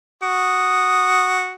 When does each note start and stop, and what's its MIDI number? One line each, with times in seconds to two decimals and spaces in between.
0.23 1.54 66
0.23 1.54 87